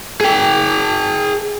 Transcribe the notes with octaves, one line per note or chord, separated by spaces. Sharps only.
G#4 G5